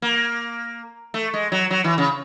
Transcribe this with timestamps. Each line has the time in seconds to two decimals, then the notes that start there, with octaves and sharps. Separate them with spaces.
0.02 A#3
1.14 A3
1.34 G#3
1.52 F#3
1.71 F#3
1.84 E3
1.98 C#3